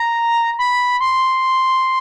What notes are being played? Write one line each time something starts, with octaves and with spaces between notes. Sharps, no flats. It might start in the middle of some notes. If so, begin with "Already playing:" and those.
Already playing: A#5
B5
C6